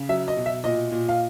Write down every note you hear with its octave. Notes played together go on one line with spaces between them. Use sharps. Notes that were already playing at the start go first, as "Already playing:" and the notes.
Already playing: C#3
F#3 E5
D#5
B2
E5
A#2 D#5
A#2
F5